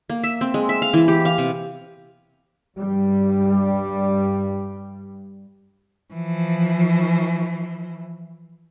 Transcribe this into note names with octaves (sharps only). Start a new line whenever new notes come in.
A#3
E5
C4
G#3
E5
F5
E3
G4
F5
C3
G2 G3
E3 F3